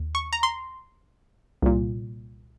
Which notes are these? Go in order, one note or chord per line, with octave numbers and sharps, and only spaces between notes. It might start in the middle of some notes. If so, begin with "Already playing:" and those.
Already playing: D#2
C#6
A#5
C6
C2 A#2